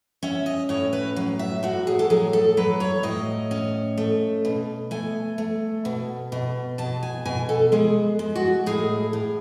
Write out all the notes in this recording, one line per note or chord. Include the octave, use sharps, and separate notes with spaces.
C#4 E5
D#5
A2 C#5
B4
F#3
E5
A2 F#4
G#4
A4
F#3 G#4
A4
F#3 B4
C#5
A2 D#5
C#4
A3
B2
A3 G#5
A3
B2
B2
B2 A5
G#5
B2 G#5
A4
G#3 G#4
G#3
F#4
A2 G#4
A2